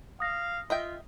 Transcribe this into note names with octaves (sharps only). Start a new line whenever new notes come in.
F5 D#6 A#6
F4 D#5 E5 G5